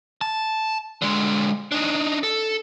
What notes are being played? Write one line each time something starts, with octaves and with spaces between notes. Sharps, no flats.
A5
D3 G#3
D4 D#4
A4